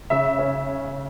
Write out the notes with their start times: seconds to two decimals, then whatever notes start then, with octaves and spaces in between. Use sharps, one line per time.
0.10 C#3 E5
0.39 C#4